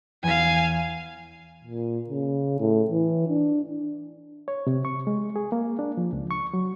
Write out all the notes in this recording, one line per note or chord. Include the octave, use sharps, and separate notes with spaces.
E2 F5 G#5
A#2
C#3
A2
E3
D4
C#5
C3
C#6
G#3
G#4
A#3
D4
F3
C#2
C#6
F#3